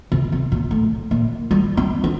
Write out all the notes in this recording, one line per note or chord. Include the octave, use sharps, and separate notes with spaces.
C3
C3
A#2
A2
A#2
G3
C4
D4